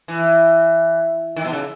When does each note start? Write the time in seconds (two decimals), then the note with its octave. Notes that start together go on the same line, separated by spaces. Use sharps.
0.08 E3
1.36 D#3
1.44 B2
1.53 C#3